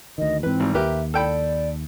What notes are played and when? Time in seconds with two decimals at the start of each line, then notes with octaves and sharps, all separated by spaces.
0.18 D2 D#3 D#5
0.43 G#2 E3 C4 B4
0.60 G#1 G3
0.74 D#2 G4 A#4 B4 E5
1.14 A4 D5 G5 B5